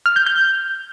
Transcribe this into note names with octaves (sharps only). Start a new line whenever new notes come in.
F6
G6
G6